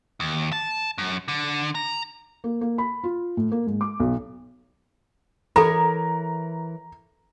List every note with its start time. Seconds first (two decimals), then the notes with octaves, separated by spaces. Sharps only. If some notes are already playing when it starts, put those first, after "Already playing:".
0.20 D#2
0.52 A5
0.98 F#2
1.28 D3
1.75 A#5
2.44 A#3
2.61 A#3
2.78 B5
3.04 F4
3.37 A2
3.52 A#3
3.67 G#2
3.81 D6
4.00 B1
5.56 E3 A4 A#4 C#5 A#5 B5